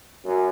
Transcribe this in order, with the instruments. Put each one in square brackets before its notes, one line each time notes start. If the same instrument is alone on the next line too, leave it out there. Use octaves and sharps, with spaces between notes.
[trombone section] F#2